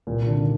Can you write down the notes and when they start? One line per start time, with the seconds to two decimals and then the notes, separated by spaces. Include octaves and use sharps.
0.07 C2 A#2 A#3
0.27 D3 D4
0.38 C3 D#3